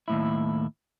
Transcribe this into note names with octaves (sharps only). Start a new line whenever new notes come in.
D#2 A2 E4